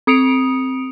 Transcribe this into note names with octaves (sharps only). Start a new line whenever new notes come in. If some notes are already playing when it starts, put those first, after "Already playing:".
C4 D#6 C#7 D7 F7